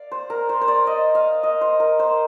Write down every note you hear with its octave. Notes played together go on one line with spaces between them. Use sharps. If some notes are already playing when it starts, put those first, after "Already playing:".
Already playing: D5 F5
C5
A#4
C5
C5
D5
D#5
F5
D#5
C5
A#4
C5